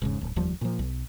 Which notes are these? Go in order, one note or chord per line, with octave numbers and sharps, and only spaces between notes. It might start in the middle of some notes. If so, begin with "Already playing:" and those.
E1 G#2 C#3
D1
F1 D#2 F3 G3
A#2 F3
B1